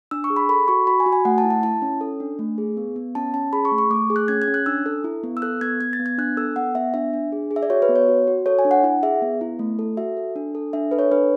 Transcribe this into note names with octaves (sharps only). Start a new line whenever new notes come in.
D4 E6
C#6
G#4
B5
A4 B5
F#4 C#6
F#4 B5
G#5
F#4
G#5
A3 F#5
A5
E4
A5
E4 A5
C#4
A4
D4
A3
G#4
B3
B3
C#4 A5
C#4 A5
G#4 B5
C#6
A3
C#6
A3 D6
G#4
F#6
C#4 G#6
G#6
C#4
F#6
D4 E6
A4
E4
B3
E6
A4 F#6
B3 G#6
B3 G#6
A6
B3
G#6
D4 F#6
A4 E6
B3 F#5
B3 E5
D4 E5
D4
G#4
G#4
E5
D5
F#4 C#5
B4
B3
C#5
F#4
F#4
A4 C#5
G#5
D4
F#5
E4 F#5
G#4 E5
B3
E4
A3
A4
F#4 E5
A4
D4
A4
D4 E5
A4 B4
C#5
D4 B4